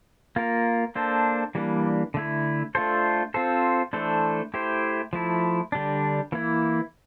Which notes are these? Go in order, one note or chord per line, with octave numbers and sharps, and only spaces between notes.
A#3 F4 A#4
A#3 D4 A4 C5
E3 G3 A#3 D4
D3 A3 E4
A3 D4 F4 A4 C5
C4 F4 A4 C5
E3 A3 D4 A4 C5
A3 E4 G4 C5
F3 A3 E4
D3 G3 D4
E3 A#3 E4